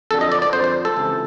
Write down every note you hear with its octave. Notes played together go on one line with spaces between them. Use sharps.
F2 D3 A4
D#5
D5
D5
F2 D3 C5
C5
A4
C#2 C3 E3